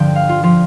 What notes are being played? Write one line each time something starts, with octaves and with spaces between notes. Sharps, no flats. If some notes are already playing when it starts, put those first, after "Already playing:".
Already playing: G2 D3 F3 G5
F5
F4
F3 F4